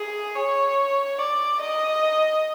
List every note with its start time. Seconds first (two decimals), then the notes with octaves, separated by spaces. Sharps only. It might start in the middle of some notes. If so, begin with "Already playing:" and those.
Already playing: G#4
0.35 C#5
1.19 D5
1.61 D#5